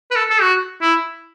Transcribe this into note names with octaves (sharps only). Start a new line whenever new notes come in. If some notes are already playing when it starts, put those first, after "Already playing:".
B4
A4
A4
F#4
E4